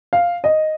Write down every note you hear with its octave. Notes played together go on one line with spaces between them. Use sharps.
F5
D#5